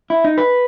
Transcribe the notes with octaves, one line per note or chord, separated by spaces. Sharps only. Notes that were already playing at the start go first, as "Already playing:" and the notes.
E4
D#4
B4